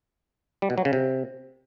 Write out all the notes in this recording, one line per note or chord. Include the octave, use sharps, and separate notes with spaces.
G3
B2
F#3
C#3
C3